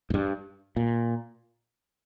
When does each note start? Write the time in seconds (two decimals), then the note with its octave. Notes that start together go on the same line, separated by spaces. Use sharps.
0.10 G#2
0.14 G2
0.76 A#2